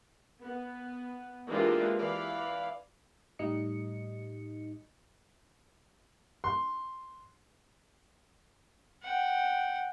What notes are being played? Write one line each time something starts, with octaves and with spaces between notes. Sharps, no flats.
B3
E3 G#3 A#3 D4 F4 G4
E3 D5 F5 B5
A2 G3 D#4 D#5 C#7
C6
F#5 G5